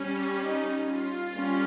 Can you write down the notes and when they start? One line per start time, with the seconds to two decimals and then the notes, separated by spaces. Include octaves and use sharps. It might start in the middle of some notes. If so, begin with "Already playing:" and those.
Already playing: G3 C#4
0.43 D#4
0.89 F4
1.36 G3 A#3 C#4